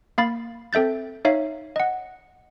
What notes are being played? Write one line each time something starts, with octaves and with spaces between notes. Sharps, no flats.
A#3 F5 B5 A6
C4 A4 E5 G6 A6
D#4 C#5 E5 F5
D#5 F#5